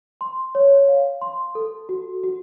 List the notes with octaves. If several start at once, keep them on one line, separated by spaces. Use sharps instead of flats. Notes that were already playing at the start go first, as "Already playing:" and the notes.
C6
C#5
F5
C6
A4
F#4
F#4